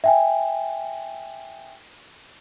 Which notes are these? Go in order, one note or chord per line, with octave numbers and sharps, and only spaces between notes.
E5 G5 G#5